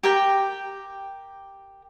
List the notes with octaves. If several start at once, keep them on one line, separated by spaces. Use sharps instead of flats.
G4 A#4 G5